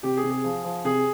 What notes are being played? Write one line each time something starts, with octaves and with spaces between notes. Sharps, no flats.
C3 G4
G#4
C3
G#4
F3
F3
C3 G#4